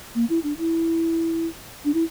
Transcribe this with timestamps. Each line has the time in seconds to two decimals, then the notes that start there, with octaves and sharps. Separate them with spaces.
0.15 A#3
0.30 E4
0.44 D4
0.58 E4
1.85 D4
1.94 E4